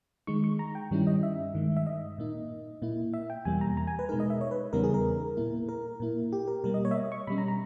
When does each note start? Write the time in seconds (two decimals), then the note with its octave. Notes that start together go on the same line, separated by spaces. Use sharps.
0.27 D#3 G#3 D#4 C#6
0.44 C#6
0.59 A#5
0.75 G5
0.91 G2 D#3 G3 C#4 E4
1.07 D#5
1.23 E5
1.54 G2 D#3 G#3
1.77 E5
1.87 D#5
2.18 A#2 A#3 D#4
2.82 A#2 A#3 E4
3.14 E5
3.30 G5
3.45 E2 B2 G3 A#3 G#5
3.61 A#5
3.77 A#5
3.87 G#5
3.99 B4
4.09 B2 G#3 D#4 A#4
4.20 D#5
4.30 E5
4.41 C#5
4.51 B4
4.73 E2 C#3 G3 B3 D#4 A#4
4.84 G#4
4.94 A#4
5.37 A#2 A#3 E4
5.69 A#4
6.00 A#2 A#3 E4
6.33 G4
6.48 A#4
6.64 B2 G3 A#3 A#4
6.74 D#5
6.85 C#5
6.91 E5
6.96 D#5
7.12 C#6
7.27 B2 G3 C#4 B5
7.38 A#5
7.48 A#5